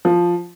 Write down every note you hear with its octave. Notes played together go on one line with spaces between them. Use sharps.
F3